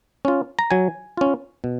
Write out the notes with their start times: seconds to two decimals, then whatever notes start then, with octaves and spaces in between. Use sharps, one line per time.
0.25 C#4 F4
0.59 A#5
0.71 F#3 G#5
1.17 C#4 F4
1.64 B2